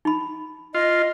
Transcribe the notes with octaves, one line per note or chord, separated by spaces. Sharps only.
D#4 B5
F4 D#5